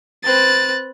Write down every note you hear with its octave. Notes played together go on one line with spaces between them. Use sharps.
C4 B4 F#6 A6